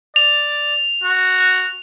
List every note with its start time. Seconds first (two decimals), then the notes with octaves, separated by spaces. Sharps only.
0.16 D5 F7
1.04 F#4